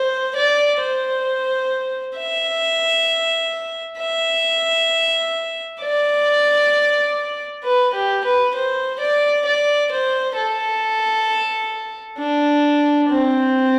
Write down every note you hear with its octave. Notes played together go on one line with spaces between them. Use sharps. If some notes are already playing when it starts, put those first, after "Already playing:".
Already playing: C5
D5
C5
E5
E5
D5
B4
G4
B4
C5
D5
D5
C5
A4
D4
C4